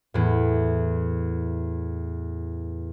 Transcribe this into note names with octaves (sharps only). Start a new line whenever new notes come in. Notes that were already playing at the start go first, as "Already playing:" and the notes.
E2 A2